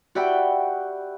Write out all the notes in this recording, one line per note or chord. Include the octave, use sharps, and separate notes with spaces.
F#4 G4 D5 E5 G5 B5